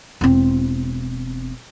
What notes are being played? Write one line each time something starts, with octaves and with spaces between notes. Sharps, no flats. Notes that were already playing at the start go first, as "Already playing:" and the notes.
E1 C4